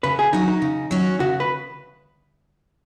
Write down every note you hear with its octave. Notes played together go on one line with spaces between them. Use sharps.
C#3 B4
G#4
F#3 C#4 D#4 F#4
D#4
C#3
F#3 C#4 F#4
C#3 F#4
B4